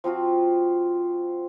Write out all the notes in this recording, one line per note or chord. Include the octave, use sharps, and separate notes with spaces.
F3 C4 F4 F#4